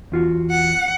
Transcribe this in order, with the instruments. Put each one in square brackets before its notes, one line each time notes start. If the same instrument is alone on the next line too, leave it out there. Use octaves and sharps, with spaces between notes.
[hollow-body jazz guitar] E2 F4 F#4
[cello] F#5